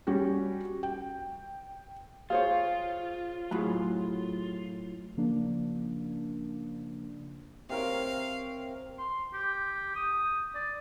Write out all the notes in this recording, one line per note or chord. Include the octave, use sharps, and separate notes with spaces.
G3 C#4 F#4 G4
G5
F4 G#4 C5 C#5 F5
A2 F#3 G#4 B5
C#3 F3 A#3 D4
C3 A#4 C#5 F5
C6
G4
D#6
D5